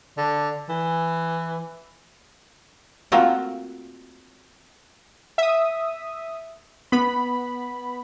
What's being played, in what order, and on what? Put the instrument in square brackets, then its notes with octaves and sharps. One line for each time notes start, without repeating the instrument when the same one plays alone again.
[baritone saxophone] D3
E3
[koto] A3 A#3 C4 F4 F#4 A#4
[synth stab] E5 D#6
B3 B5